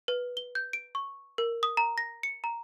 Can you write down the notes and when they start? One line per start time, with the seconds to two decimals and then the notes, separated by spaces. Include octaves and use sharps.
0.08 B4
0.37 G7
0.55 G6
0.73 D7
0.95 C#6
1.38 A#4
1.63 D#6
1.77 A#5
1.98 A#6
2.23 C#7
2.44 A#5